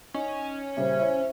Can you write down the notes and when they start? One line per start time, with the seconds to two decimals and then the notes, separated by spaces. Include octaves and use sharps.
0.14 C#4 D#4
0.77 A#2 C#3 G3 C5 E5
0.99 E4 C#5